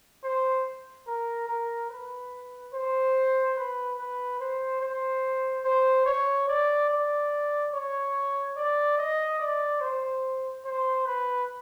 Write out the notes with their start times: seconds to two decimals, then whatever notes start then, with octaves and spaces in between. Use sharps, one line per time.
0.24 C5
1.07 A#4
1.48 A#4
1.90 B4
2.74 C5
3.56 B4
3.99 B4
4.40 C5
4.82 C5
5.65 C5
6.06 C#5
6.48 D5
6.90 D5
7.73 C#5
8.57 D5
8.98 D#5
9.40 D5
9.81 C5
10.65 C5
11.06 B4